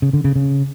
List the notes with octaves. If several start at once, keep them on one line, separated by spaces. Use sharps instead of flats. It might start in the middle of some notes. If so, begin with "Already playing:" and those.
C#3
D3
C#3
C#3